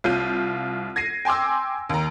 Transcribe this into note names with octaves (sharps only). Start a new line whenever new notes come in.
C2 F4 G6 D#7
G#6 A#6 C7 D#7
G5 G#5 C6 D6 E6
D#2 A#5